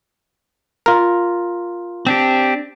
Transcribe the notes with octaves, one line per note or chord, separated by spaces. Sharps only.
F4 A#4
C4 D4 G4